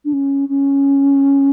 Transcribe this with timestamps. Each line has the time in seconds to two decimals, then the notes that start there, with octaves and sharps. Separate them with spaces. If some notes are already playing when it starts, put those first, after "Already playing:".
0.05 D4
0.13 C#4
0.49 C#4